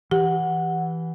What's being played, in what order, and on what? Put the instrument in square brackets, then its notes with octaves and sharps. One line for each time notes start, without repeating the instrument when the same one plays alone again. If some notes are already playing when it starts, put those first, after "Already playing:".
[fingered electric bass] E3 [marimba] G4 [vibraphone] F#5